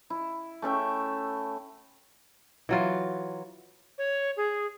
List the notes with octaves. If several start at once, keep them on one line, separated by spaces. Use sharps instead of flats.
E4
A3 C#4 E5 G5
E3 F#3 F4
C#5
G#4